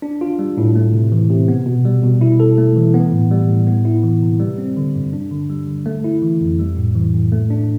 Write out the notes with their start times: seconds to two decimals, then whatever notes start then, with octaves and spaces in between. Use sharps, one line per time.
0.02 D4
0.21 F4
0.39 G3
0.57 A2
0.76 A3
0.93 C3
1.12 E3
1.30 C3
1.48 B3
1.66 B2
1.85 G3
2.03 B2
2.21 E4
2.40 A4
2.58 A3
2.76 E3
2.94 B3
3.12 A2
3.31 G3
3.49 A2
3.67 B3
3.85 E4
4.04 E3
4.22 C3
4.40 G3
4.58 C4
4.77 D3
4.95 G2
5.13 D4
5.31 D3
5.50 G3
5.67 D3
5.86 A3
6.04 E4
6.22 E3
6.41 F2
6.59 G3
6.77 A2
6.95 E3
7.14 A2
7.32 A3
7.50 D4